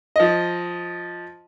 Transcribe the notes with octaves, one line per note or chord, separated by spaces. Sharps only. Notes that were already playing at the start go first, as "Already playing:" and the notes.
F3 D#5